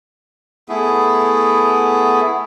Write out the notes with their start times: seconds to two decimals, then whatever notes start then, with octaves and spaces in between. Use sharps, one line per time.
0.69 A3 B3 E4 G#4